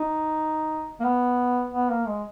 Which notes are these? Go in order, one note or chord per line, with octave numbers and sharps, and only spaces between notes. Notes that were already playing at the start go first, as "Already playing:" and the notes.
Already playing: D#4
A#3
B3
B3
A#3
G#3